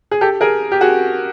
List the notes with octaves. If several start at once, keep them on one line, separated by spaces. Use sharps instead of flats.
G#4
G4 A4
G#4 A#4
G4
F#4 G#4